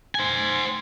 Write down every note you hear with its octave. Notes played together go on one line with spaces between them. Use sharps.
C5 G#5